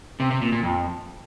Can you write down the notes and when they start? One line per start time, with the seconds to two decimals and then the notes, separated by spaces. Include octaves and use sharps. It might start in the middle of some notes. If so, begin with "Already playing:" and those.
0.20 C3
0.31 C3
0.42 A#2
0.52 A#2
0.63 F2